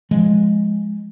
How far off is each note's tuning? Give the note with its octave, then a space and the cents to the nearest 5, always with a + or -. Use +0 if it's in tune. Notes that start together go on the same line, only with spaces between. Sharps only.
F3 +0 G#3 +0